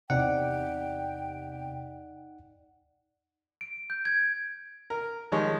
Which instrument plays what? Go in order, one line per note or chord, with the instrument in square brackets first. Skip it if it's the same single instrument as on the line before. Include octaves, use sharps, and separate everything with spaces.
[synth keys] E2 C3 [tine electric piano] D#4 F#5 [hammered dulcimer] D5 [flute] G5
[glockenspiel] D7
G6
G#6
[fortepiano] A#4
D#3 F3 G3 G#3 C#5